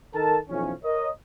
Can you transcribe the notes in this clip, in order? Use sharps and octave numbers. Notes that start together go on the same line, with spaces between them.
D#3 A4 A#4 A5
B1 F2 E3 F3 C#4
A#4 C#5 D#5